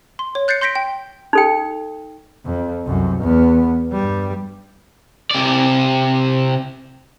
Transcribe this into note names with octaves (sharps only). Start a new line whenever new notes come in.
C6
C#5
F#6 G6 A6 C7 C#7
C6 G6 A#6 B6 D7
G5
D#4 A4 G5
F2
C2 F#2
E2 B3
G2 G3
C3 D5